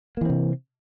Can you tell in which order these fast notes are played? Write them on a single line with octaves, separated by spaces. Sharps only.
A#3 E3 C4 C3